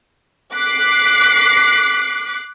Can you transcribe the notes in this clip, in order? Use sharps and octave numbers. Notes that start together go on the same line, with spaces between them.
D6 F#6 B6 C7